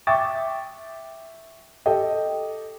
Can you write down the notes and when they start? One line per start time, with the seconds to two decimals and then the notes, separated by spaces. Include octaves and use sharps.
0.07 E5 G5 C#6 D6 A6
1.86 G4 A4 D#5 G5